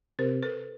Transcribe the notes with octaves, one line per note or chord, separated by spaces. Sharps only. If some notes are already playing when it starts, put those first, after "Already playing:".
C3 A#4 C5
A4 B4